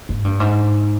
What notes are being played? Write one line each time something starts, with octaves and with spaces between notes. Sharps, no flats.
G#2
G2
G#2